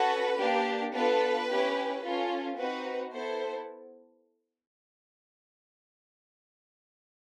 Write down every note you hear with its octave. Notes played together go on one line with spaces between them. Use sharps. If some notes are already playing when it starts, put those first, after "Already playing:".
Already playing: C#4 F#4 A4 B4
A#3 D4 G4
B3 D4 F4 A4 B4
C#4 E4 G4
C#4 F4 A4
C4 D#4 F#4 B4
B3 E4 A4 C5